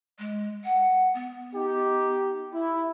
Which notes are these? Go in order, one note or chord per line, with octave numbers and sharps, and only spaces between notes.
G#3
F#5
B3
D#4 G4
E4